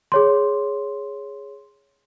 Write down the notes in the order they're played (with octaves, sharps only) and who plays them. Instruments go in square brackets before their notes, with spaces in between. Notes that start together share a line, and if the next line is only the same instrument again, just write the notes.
[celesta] G#4 C#5 C6